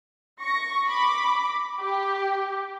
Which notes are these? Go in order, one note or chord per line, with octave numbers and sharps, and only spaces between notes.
C#6 A#6
B5 D6
G4